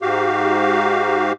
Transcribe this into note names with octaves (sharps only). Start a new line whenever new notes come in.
G#2 F#4 G4 F5